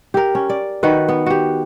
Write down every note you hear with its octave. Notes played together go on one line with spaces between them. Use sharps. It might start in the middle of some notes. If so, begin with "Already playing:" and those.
G4 A#4
C#4
D5
D#3 F#4 B4
B3
F#4 G4